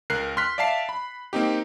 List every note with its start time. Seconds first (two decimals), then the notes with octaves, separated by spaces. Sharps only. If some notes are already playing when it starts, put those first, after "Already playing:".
0.10 C#2 A#4 F#6 C7
0.37 C6 F6 F#6 B6
0.58 D5 E5 F5 A5 C7
0.89 B5
1.33 A#3 C4 D#4 G4